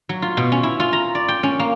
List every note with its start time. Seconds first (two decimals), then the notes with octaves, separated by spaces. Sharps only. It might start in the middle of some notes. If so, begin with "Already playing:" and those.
0.09 F#3
0.22 F4
0.37 B2
0.52 C#4
0.63 E4
0.80 F4
0.93 A#5
1.15 D5
1.28 G5
1.43 C#4
1.59 A#3